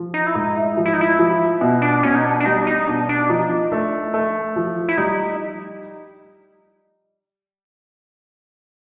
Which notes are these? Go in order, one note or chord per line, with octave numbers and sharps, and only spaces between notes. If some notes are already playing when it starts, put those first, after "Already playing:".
Already playing: F3
D#4
E4
G#2 D#4
E4
F3
E4
D#4
E4
F3
B2
D4
B2 C#4
D#4
D4
D4
G3 D#4
D4
D#4
B2 D4
D4
F3 D#4
A3 D4
E4
A3 D#4
F3 E4
E4
G3 D#4